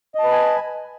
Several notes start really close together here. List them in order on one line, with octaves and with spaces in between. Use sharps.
D#5 A5 B4 B5 G#5